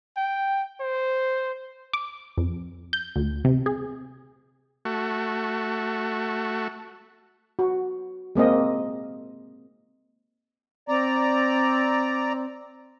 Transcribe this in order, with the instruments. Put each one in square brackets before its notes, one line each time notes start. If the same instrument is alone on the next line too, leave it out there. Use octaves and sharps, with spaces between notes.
[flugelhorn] G5
C5
[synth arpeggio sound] D6
F2
G6
D2
C3
G#4
[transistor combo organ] A3 F#4
[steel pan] F#4
G#3 A#3 C4 D#5
[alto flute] C4 [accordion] D5 A#5